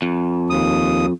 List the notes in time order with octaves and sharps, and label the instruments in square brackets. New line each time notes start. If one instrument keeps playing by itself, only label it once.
[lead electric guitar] F2
[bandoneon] D#2 D#6